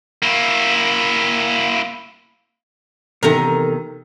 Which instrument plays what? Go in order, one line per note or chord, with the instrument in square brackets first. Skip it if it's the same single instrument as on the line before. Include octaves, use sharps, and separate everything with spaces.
[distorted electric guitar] A#3 E4
[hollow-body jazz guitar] E2 [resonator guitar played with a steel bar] C3 D#3 [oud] A4 A#4